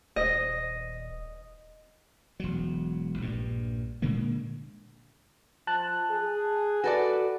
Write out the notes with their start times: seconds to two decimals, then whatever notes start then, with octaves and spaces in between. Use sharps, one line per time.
0.16 D#1 D#5
2.40 E1 F#3
3.18 A#1 G2
4.02 A#2 D3 G#3 A#3
5.67 F3 A5 F#6
6.10 G#4
6.84 F#4 A4 B4 D5